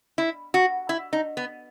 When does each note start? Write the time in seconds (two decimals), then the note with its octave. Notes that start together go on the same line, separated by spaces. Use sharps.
0.18 E4
0.54 F#4
0.89 E4
1.13 D#4
1.37 B3